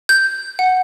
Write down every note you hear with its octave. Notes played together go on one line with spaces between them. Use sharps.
G6
F#5